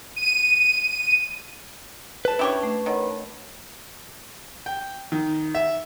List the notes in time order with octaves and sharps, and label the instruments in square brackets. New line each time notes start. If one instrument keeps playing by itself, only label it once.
[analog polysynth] D#7
[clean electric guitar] B4 A5
[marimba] C#4 D4 [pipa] E4 G4 C#5
[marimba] A3
[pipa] D#3 [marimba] C#5 F#5 B5
[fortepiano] G5
D#3
E5